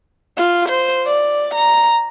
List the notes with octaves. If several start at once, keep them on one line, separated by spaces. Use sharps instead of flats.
F4
C5
D5
A#5